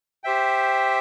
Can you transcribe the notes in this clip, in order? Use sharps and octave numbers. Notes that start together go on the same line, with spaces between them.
G4 C5 E5 G5